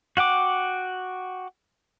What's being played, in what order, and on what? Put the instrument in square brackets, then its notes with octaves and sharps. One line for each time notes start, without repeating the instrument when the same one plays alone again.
[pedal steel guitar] F#4 F#5 G5 D6